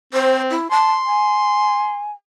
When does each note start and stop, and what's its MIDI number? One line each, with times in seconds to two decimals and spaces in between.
0.13 0.55 60
0.13 0.41 72
0.51 0.70 64
0.71 0.92 81
0.71 2.01 84
1.06 2.11 80